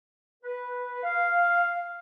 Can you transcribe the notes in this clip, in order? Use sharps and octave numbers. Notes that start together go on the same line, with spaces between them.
B4
F5